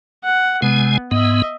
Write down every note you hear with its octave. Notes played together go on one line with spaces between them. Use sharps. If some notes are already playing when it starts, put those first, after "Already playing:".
F#5
C3 G#3 B3 G#5
G#2 B3 D#5 E5